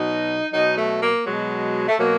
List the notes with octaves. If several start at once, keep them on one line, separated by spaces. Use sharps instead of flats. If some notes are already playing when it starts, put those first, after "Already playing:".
Already playing: B2 F#3 D#4
B2 F#3 D#4
A3
A#3
B2 F#3 G#3
A3
B2 F#3 A#3